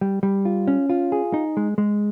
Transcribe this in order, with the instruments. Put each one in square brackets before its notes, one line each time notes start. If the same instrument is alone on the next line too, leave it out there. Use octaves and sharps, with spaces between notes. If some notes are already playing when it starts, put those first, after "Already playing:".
[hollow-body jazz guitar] G3
G3
F4
C#4
F4
G#4
D#4
G#3
G#3